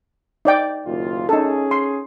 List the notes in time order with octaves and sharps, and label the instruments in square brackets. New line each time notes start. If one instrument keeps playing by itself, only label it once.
[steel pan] D#4 D5 G5
[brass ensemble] F#1 D#2 F4
[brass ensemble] C#4 G#4 [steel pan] D#4 A4
[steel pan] C6